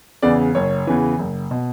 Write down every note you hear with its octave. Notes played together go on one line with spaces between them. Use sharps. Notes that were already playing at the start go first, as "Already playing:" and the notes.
E2 C#3 E3 D5
F#1 C#5
E2 C#3 E3
F#1
B2